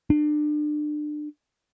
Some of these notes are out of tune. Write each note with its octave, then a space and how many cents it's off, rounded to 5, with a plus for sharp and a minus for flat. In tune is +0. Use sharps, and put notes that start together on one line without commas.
D4 +30